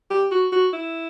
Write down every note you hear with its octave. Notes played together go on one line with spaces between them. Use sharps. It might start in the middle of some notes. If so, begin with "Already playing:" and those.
G4
F#4
F#4
E4